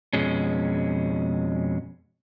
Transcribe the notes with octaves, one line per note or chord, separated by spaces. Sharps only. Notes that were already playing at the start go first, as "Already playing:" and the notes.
F2 B2 G#3 C#4